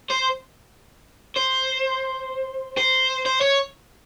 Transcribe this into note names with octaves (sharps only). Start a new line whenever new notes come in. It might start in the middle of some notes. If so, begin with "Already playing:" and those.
C5
C5
C5
C5
C#5